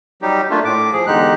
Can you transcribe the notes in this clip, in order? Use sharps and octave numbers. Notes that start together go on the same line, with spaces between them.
F#3 G3 D#4 G4
A3 A#3 D4 F4
A2 D6
F3 G#4
E2 D3 G#3 D#4 G4 F#6